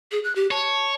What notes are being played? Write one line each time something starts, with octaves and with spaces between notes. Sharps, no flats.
G#4
F#6
G4
C#5 A5